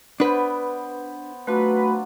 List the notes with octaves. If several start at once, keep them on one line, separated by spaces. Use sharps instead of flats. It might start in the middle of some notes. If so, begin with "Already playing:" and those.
B3 D4 B4 C5
F#3 A3 D4 F4 F#4 B4